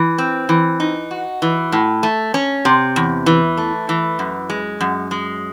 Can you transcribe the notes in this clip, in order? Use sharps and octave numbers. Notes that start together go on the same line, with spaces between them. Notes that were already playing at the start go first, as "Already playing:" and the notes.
Already playing: E3
C4
E3
D#4
F#4
E3
A2
A3
C#4
C3
E2
E3
A3
E3
F#2
G#3
F#2
G#3